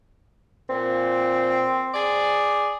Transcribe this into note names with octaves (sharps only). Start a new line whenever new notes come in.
A#2 C4
G#4 D5